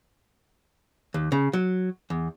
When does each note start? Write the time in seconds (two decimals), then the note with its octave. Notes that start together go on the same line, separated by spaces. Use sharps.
1.14 D#2
1.32 C#3
1.53 F#3
2.10 E2